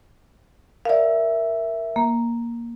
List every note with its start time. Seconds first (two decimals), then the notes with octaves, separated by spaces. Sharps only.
0.85 A#4 D5 E5 F5
1.96 A#3